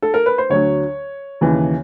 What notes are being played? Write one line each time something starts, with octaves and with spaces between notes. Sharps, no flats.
A4
A#4
B4
C5
D2 D3 F#3 C#5
D#2 C#3 E3